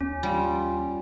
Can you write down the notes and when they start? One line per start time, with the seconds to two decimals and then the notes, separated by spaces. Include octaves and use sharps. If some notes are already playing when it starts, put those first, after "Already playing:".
0.01 D#2 C#4
0.23 G3 F4